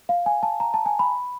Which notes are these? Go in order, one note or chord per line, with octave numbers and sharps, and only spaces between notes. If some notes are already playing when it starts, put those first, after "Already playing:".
F5
G#5
A5
A#5
A5
G#5
B5